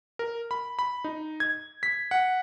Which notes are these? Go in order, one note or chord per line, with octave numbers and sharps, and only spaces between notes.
A#4
B5
B5
D#4
G#6
B6
F#5